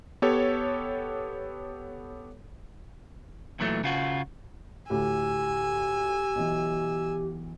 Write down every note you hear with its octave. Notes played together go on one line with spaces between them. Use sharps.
B3 G4 A4 C#5
A#2 E3 F#3 A3
C#3 F4 F#4
D2 A2 G4 G#5 E6
B1 E3